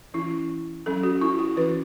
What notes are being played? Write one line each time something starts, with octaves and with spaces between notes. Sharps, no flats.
E3 C#4 E4
F#3 C#4 A4
F#4
E4
F#4
E3 C#4 B4